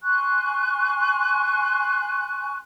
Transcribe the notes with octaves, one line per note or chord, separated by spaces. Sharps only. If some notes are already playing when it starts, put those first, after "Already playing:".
G#5 C6 C#6 F#6